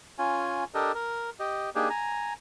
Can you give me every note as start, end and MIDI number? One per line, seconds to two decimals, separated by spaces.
0.19 0.64 61
0.19 0.64 65
0.19 0.64 80
0.74 0.92 62
0.74 0.92 67
0.74 0.92 69
0.74 0.92 70
0.74 0.92 75
0.95 1.30 70
1.39 1.70 67
1.39 1.70 75
1.75 1.89 58
1.75 1.89 62
1.75 1.89 63
1.75 1.89 67
1.75 1.89 68
1.90 2.34 80
1.90 2.34 82